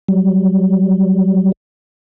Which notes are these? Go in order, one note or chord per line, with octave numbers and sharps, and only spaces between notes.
F#3 G3